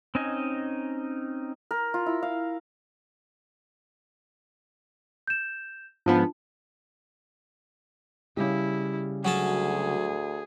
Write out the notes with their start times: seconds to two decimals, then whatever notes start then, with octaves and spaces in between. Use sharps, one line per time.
0.15 C4 C#4 D#4 D#5 G#5
1.71 A#4
1.94 F4
2.06 E4
2.23 F5
5.27 G6 E7
6.06 G#2 F3 B3 D4 F4 A5
8.37 C#3 G3 E4 G4
9.25 D2 F#3 C#4 G#4 A5